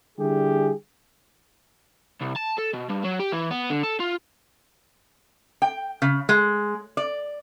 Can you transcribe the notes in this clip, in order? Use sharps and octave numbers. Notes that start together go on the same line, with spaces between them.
D3 G3 E4 G4 G#4
C2
A5
A4
B2
G2
F#3
G4
E3
B3
D3
A4
F4
G5
C#3
G#3
D5